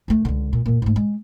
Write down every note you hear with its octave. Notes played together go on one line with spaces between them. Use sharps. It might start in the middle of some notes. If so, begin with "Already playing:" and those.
D2 A3
C#2 D3
A#2
F#2 A#2
G#2 A3
G#3